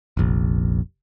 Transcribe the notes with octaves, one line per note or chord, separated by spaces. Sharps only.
F1 A#1